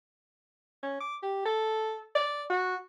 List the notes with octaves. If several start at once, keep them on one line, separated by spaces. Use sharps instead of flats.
C#4
D6
G4
A4
D5
F#4